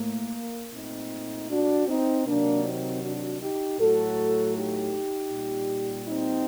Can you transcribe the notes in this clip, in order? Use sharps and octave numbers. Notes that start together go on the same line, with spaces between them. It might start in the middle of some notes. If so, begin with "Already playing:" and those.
Already playing: A2 A3 A#3
A#2 A3 C4 D#4
D4 F#4
C4 D#4
C3 D#3 F#3 A#3 D4
C4 D#4
D4 F#4
D#4 G4
A2 F#3 A3 F#4 A4
D#4 G4
A#2 G3
C4 D#4